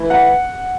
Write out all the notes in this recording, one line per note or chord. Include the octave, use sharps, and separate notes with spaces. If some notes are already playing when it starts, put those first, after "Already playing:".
Already playing: E3 A3 E4
F#5